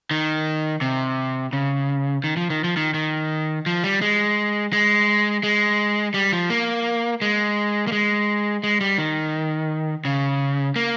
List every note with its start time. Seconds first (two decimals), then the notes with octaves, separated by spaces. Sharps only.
0.11 D#3
0.81 C3
1.53 C#3
2.24 D#3
2.37 F3
2.50 D#3
2.64 F3
2.77 D#3
2.94 D#3
3.66 F3
3.84 G3
4.01 G#3
4.73 G#3
5.43 G#3
6.14 G3
6.33 F3
6.50 A#3
7.22 G#3
7.87 A#3
7.92 G#3
8.64 G#3
8.81 G3
8.98 D#3
10.05 C#3
10.76 A#3